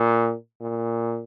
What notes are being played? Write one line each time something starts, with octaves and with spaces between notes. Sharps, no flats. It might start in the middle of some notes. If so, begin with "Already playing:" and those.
Already playing: A#2
A#2